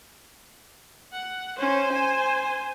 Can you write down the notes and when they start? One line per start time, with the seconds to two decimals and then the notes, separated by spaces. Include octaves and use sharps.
1.12 F#5
1.59 C#4 C5
1.94 G#5